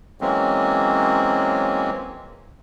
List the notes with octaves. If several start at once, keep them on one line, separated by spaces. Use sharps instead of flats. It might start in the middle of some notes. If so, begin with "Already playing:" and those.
E3 F#3 G#3 A#3 C4 C#4